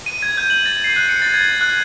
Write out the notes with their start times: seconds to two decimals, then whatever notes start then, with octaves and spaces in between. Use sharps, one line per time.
0.06 D#7
0.22 G#6
0.37 G6
0.50 F#7
0.66 A6
0.84 C7
0.96 F#6
1.09 C#7
1.22 A6
1.34 G#6
1.61 F#6